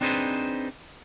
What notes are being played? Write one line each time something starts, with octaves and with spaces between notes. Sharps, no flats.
C4 D4 D#4 G#4 B4 C5